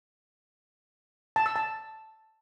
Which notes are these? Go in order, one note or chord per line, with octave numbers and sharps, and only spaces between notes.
A5
E6
A5